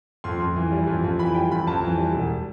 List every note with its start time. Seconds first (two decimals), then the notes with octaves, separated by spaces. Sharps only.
0.24 F2 C6
0.40 F2
0.56 E3
0.72 G3
0.87 F2
1.04 F2
1.19 E3 B5
1.34 G3 G5
1.51 F2 B5
1.67 F2 A5
1.83 E3
1.98 G3
2.14 E1